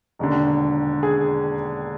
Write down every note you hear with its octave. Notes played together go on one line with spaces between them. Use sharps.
E1 D#2 D3
G#4